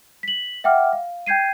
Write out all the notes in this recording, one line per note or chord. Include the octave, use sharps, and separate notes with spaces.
B6 F#7
E5 F#5 G5 D6 F6
F5
G5 G6 G#6 C7 D#7